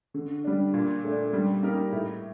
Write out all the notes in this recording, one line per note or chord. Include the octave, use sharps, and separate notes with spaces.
D3
G3 D4
A#2
A3 D4
G3
A#3 D#4 G4 A#4
A2